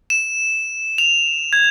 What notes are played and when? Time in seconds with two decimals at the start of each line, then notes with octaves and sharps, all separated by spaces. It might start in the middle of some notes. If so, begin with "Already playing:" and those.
0.10 E7
0.98 F7
1.53 G#6